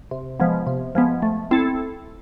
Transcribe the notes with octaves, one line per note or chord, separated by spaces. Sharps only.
C3
F3 G#3 B3
C3
F3 G#3 B3
A3
C4 E4 A4